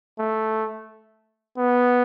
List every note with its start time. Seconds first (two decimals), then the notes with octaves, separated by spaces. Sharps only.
0.19 A3
1.58 B3